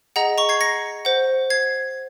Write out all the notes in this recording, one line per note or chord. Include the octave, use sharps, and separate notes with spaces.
G#4 D#5 F#5 A#5
A#5 C#6
G#6 C7
A#6 C#7
C5 F#5
G#6 C7